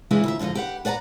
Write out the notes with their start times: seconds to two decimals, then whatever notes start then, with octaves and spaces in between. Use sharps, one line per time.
0.11 C#3 E3 G#3 D4 E4 B4
0.24 D2 F4 E5
0.39 G#2 D3 E3 F3 D#5
0.55 G4 B4 F#5
0.85 B4 D5 F#5 G#5 A#5